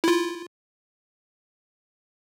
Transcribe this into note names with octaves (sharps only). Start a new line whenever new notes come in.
E4 F4